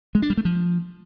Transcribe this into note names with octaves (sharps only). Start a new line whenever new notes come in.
G#3
D4
G3
A3
F3